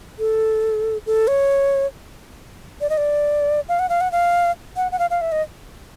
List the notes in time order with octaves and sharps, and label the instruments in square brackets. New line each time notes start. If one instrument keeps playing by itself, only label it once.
[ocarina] A4
A4
C#5
D5
D#5
D5
F5
F#5
F5
F#5
F5
F#5
F#5
F5
F5
E5
D#5